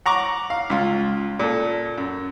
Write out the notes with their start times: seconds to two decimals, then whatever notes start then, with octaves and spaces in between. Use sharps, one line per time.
0.06 F#5 A#5 C#6 D6
0.50 F5
0.70 C#2 F4
1.39 A#2 A4
1.98 F#2